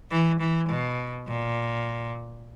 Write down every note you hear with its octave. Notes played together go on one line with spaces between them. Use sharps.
E3
E3
B2
A#2